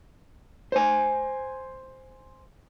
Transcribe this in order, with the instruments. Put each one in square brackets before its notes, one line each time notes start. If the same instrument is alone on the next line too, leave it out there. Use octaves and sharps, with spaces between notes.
[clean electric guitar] C5 G#5